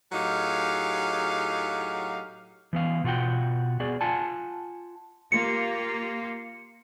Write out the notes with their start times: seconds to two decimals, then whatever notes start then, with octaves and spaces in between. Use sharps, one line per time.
0.12 A2 F#3 D#4 G4 G#4 F5
2.73 E3 B3 F5
3.04 B2 F4 F#4 F#5 G5
3.80 B3 F#4 G#4 D5
4.01 F4 F#5 G#5 A5
5.32 A#3 F4 G4 C#7